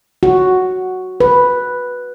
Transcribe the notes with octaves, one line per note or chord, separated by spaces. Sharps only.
F#4
B4